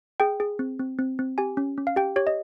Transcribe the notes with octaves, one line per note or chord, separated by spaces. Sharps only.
G#4 G5
G#4
C4
C4
C4
C4
G4 G#5
C#4
C#4
F5
G4 G5
G4 C#5
D#5